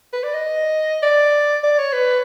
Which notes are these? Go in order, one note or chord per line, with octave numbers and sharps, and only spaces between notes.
B4
D5
D#5
D5
D5
C#5
B4